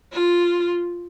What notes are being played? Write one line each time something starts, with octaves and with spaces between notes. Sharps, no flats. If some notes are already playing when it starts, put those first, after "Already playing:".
F4